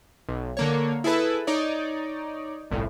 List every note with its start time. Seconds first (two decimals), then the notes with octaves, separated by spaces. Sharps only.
0.29 B1
0.57 D3 A#3 C#5
1.04 E4 G#4 A4 B4
1.47 D#4 C#5 D5
2.71 G1 C2 A2